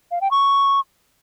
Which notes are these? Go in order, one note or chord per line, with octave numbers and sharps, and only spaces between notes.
F5
G5
C#6